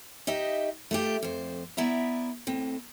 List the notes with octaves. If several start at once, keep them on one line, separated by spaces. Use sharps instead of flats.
D#4 G4 D#5 E5
A3 F4 G4
F2 C5
B3 E4 D5 E5 A#5
A2 C4